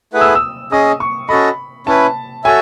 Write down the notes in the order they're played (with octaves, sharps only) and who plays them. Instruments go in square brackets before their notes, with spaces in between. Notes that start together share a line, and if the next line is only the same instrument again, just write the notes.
[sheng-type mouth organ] A3 E4 G#4 B4 F#5
[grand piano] E6
D#6
E6
[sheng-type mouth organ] C#4 G#4 D#5 [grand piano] D#6
[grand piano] C#6
[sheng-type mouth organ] C#4 F#4 A4 D#5 [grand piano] B5
[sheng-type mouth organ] C#4 E4 B4 [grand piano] A5
[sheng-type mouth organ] F#4 A4 C#5 E5 [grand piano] G#5